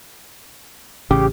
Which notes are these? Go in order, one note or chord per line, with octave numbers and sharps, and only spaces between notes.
A1 C#3 G4